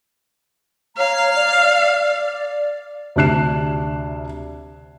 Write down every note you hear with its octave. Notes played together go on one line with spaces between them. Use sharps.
C#5 F5 A#5
D5
D5
D2 C3 D4 F#6 C7 E7